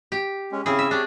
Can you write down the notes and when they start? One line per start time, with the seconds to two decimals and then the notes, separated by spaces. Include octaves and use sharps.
0.12 G4
0.52 G#3 C#4
0.66 C#3 C4 C#4 E4 G#4
0.79 E5
0.91 D4 G4 C#5